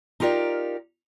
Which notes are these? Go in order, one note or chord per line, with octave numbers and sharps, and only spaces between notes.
D#4 F4 G4 A#4 D5